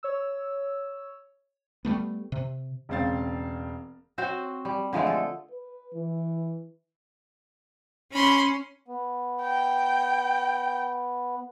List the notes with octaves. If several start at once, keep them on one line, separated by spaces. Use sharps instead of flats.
C#5 E6
G3 A3 B3
C3
E1 C#3 C4 F5 A6
F#3 C4 F#4 C5
G3
D3 F3 G#3 A3
A4
B4
E3
C#4 B5 C6
B3
G5